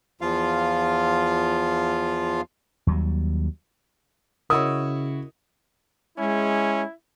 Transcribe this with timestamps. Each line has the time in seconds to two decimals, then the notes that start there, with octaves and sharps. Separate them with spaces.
0.21 E2 F3 F4 F5
2.87 D#2 F#3 G3
4.50 C#3 E4 F#4 A#4 C#5 D#5 D#6
6.18 G#3 C#4 E4